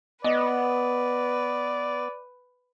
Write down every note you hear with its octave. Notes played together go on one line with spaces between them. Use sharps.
B3 B4 D5 D#5